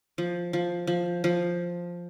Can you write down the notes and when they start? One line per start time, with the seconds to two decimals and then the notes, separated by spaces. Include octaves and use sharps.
0.18 F3
0.53 F3
0.87 F3
1.24 F3